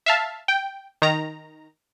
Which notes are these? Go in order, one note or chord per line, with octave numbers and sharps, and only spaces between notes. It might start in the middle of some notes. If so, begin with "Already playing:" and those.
E5 F5 A5
G5
D#3 A#5